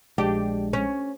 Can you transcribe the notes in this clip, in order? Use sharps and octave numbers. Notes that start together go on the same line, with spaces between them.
A#1 G#3 D4 G4
C#4